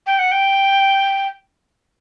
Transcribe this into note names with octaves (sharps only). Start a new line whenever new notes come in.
G5
F#5
G5